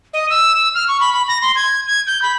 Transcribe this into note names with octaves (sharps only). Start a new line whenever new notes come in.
D#5
E6
F6
C#6
B5
B5
A#6
C6
G#6
G#6
G6
B5